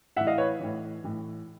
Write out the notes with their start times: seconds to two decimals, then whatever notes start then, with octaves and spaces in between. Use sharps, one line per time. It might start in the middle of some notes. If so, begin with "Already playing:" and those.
0.16 A2 E5 F#5
0.20 E3
0.27 D#5 F5
0.38 B4 C#5
0.60 A2 E3
1.04 A2 E3